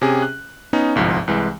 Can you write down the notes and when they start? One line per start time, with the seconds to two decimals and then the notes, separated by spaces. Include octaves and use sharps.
0.02 C3 C#4 G4 G#4
0.22 F#6
0.73 B3 C#4 D#4
0.95 G1 C2 G#2 F3
1.28 C2 E3 G#3